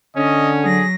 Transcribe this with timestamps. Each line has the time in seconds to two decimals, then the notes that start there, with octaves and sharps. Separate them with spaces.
0.16 D3 C#4 D#5
0.64 F#3 G#4 A#6